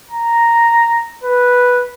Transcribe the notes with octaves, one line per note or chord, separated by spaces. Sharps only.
A#5
B4